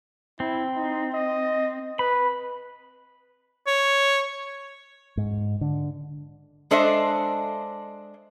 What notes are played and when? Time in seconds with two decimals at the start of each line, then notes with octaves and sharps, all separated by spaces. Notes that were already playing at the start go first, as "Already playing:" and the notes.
0.40 C4 E4
0.76 D#4
1.13 D#5
1.99 B4 B5
3.67 C#5
5.17 G#2
5.61 D3
6.71 G#3 D4 A4 C5 D#5 E5